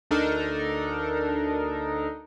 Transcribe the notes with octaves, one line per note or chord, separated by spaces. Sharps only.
D2 D4 D#4 A4 A#4